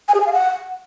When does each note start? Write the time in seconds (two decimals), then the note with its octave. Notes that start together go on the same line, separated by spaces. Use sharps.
0.08 G#5
0.14 G#4
0.20 G#5
0.26 F5
0.32 F#5